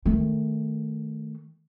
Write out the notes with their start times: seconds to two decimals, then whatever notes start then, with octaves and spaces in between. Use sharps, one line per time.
0.06 D#3 A3